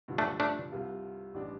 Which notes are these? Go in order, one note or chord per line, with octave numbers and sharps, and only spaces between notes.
G2 D3 F3
A3 D4
A3 D4
C2 C3 G3 F4
A1 G3 D4